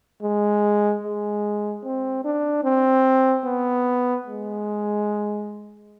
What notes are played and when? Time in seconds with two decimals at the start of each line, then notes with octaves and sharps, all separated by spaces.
0.23 G#3
1.03 G#3
1.84 C4
2.25 D4
2.64 C4
3.45 B3
4.26 G#3